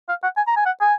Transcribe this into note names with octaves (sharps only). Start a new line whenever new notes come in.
F5
F#5
G#5
A#5
G#5
F#5
G#5